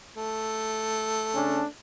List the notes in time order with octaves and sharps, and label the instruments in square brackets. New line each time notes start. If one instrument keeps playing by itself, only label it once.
[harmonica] A3
[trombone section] C#3 C#4 D4